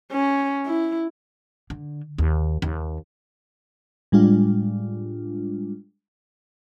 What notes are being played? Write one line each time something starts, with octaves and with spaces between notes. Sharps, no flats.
C#4
E4
D3
D#2
D#2
A2 G3 G#3 D4 F4